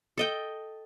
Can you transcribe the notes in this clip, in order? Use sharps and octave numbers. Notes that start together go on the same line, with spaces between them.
A4 D#5 G5